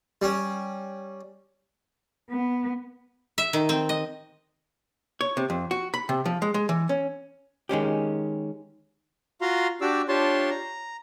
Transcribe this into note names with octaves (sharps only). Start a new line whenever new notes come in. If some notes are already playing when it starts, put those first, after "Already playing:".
G3 C#4
B3
E5
D#3
C4
D#5
C#5
C3
F2
F#4
B5
C3
F3
G#3
G#3
E3
C#4
D#3 G#3 C#4 G4
F4 F#4 F5 A#5 C6
D4 F#4 G4 D5 D6 E6
D4 F4 G4 C#5 A5 C6
A#5